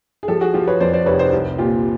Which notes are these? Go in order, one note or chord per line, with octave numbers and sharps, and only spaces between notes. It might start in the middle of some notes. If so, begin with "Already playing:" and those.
G#4
F3 G4 A4
F#4 G#4
F3 F4 G4
B4 C#5
F2 C5 D5
C5 D5
F1 B4 C#5
C5 D5
C2
A#2 F4 G4